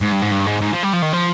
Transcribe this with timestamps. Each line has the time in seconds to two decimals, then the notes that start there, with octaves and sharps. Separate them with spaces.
0.01 G#2
0.12 G2
0.22 G#2
0.31 G2
0.47 G#2
0.61 G#2
0.73 F3
0.83 G3
0.93 F3
1.02 D#3
1.12 F3